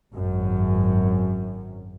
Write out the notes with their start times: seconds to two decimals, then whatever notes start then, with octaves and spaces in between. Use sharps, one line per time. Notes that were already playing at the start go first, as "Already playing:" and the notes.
0.13 G#1 F#2